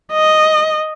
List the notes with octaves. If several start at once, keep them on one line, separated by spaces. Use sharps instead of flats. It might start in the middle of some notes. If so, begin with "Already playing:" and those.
D#5